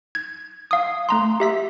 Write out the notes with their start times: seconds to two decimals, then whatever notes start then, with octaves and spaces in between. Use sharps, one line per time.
0.15 G#6
0.71 F5 D#6
1.09 A3 A#5 C6
1.40 G4 E5 B6